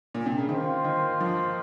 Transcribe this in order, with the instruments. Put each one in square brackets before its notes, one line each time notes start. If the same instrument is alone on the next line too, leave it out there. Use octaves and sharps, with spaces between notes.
[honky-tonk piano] A#2
C3
C#3
[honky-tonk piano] D#3 [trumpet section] A#3 F4 C5
[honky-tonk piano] D#3
F3